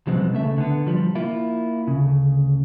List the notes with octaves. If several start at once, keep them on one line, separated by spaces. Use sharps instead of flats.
B1 F3 G3 G#3 B3 C4
D2 C#3 A3 E5
D3 B3
F3 G3
A#3 E4 F4
D2 C#3